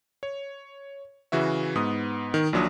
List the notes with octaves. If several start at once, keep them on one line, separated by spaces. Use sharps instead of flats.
C#5
C#3 E3 F#4 E5
G#2 B3 D#6
D#3
A#1 A#2 F#3 D4 D#6